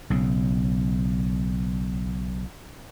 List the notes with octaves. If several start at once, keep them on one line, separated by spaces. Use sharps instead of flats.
B1 C#3